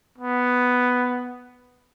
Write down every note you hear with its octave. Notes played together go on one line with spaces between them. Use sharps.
B3